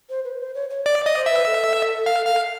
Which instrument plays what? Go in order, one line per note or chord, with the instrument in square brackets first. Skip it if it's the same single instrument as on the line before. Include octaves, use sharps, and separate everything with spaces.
[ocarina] C5
B4
C5
C#5
C#5
[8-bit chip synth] D5
[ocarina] D5
[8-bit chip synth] D#5
[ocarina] C5
[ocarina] B4 [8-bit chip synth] E5
[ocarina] A4
[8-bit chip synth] F5
F5